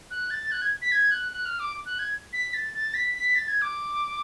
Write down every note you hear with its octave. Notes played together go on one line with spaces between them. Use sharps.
F#6
A6
F#6
G#6
B6
G#6
F#6
F#6
F6
D6
F#6
G#6
B6
A6
A6
B6
B6
A6
G#6
D6